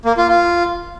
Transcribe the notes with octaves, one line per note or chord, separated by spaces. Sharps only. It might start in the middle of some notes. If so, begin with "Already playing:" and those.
A#3
F4
F4